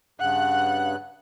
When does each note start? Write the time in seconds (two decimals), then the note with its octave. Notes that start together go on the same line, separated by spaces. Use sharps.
0.20 G2 C#3 F#5 F#6